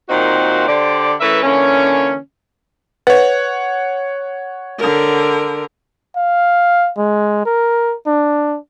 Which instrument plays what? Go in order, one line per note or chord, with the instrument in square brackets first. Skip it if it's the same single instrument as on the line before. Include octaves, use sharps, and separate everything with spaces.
[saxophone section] A#2 D#3 C4 D#4 F4 F#4
D3 G4 C5 D5
E3 A3 C#4 A#4 B4 E5
D3 E3 A#3 C#4
[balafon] B4 [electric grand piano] C#5 F#5
[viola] D3 A#4
[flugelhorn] F5
G#3
A#4
D4